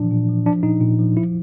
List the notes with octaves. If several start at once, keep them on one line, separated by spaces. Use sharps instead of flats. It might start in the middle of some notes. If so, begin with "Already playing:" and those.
Already playing: A#2 E3 F3 D4
A#2
F3
F3 D4
A#2 D#4
A#2
F3
F3 E4